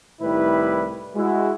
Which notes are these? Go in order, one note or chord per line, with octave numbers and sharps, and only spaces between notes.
C2 A2 D#3 G3 E4 B4
G#3 E4 F#4